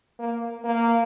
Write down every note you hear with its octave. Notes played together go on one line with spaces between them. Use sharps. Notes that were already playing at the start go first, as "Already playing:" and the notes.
A#3
A#3